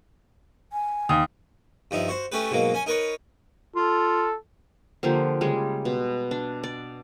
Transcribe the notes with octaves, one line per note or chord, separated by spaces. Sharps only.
G#5
D#2 D#6
G2 F3 D#4 E4
F#4 C5
A3 C#4 G4 B4
G#2 B2 F#3 A#3
C#4 G#5
D#4 A#4 B4 C#5
F4 A4
D3 F3 A#3 G4
C#3 G3 G#3
B2
D4
D5